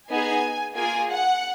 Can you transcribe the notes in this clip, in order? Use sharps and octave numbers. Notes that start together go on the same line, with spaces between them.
B3 D#4 G#4 G#5
A#3 F4 G#4 G#5
F#5